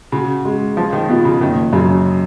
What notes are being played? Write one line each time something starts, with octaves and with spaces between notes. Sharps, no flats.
C#3 F#4
G#3
F3 F4
D#3
B2 F3
C#3
F#1 D#3
F#2 C#3